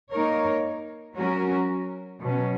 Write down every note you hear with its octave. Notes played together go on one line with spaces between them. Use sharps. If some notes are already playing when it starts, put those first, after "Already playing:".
A#3 D#4 A#4 C#5
F#3 C#4 F#4 A#4
B2 F#3 C#4